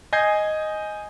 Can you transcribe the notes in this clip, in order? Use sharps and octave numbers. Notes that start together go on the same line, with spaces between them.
D#5 G#5 D#6 G6 G#6 C7